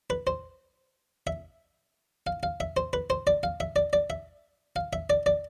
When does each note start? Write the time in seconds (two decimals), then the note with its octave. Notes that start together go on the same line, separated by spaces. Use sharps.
0.10 B4
0.27 C5
1.27 E5
2.27 F5
2.43 F5
2.60 E5
2.77 C5
2.93 B4
3.10 C5
3.27 D5
3.43 F5
3.60 E5
3.76 D5
3.93 D5
4.10 E5
4.76 F5
4.93 E5
5.10 D5
5.26 D5